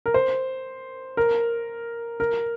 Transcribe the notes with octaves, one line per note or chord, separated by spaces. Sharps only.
A#4
C5
A#4
A#4